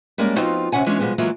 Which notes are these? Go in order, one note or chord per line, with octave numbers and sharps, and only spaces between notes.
G3 G#3 A#3 C#4 A#4 D5
F3 B3 C4 D#4 F4 F#4
D2 C3 C#4 F#5 G#5
E3 G#3 B3 C#4 D4 F4
B2 F3 G3 G#3 B3
E3 F#3 G#3 A#3 F4